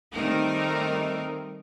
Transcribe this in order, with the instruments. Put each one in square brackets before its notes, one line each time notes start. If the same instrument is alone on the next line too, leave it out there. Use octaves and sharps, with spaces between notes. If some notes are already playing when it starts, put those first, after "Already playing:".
[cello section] D#3 G3 A3 C4 D#4 A#4